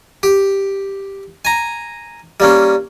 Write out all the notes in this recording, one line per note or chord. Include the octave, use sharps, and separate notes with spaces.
G4
G#5 A#5
G3 A#3 C#4